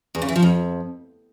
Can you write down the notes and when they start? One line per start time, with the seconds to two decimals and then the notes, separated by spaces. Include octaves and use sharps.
0.15 E2
0.22 C#3
0.29 E3
0.36 F3
0.42 F2